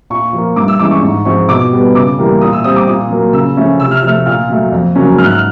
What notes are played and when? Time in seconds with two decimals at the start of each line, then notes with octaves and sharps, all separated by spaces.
0.10 A#2 C#6
0.33 F3 A#3
0.56 G2 D6
0.68 E6
0.79 E3 G#3 C#4 D6
0.91 C#6
1.02 G#2 C#6
1.25 F3 G#3 C4 C#6
1.49 B2 D6
1.72 G3 B3
1.95 C#3 D6
2.18 E3 G3 A#3
2.41 A#2 D#6
2.53 E6
2.64 G3 C4 D#6
2.76 D6
2.88 A#2 D#6
3.10 F#3 A#3
3.33 C#3 E6
3.57 F3 A3 C#4
3.80 C3 E6
3.91 F6
4.03 F3 A3 F6
4.14 E6
4.26 A#2 F6
4.49 F#3 A3
4.72 F2
4.95 C#3 F#3 A#3 C#4
5.18 G#2 F6
5.25 F#6
5.33 F6